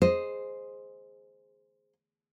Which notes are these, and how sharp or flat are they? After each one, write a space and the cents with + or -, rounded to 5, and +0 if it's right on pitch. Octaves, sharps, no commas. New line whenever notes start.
G#4 +0 C5 +0 D#5 +0